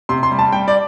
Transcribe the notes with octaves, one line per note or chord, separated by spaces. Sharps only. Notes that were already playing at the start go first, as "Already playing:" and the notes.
C3 C6
C6
G3
A5
G3 G5
D5